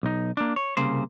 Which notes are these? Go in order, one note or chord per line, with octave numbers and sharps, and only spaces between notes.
B1 D#4
A#3 D4
C#5
C2 C#3 A#3 C5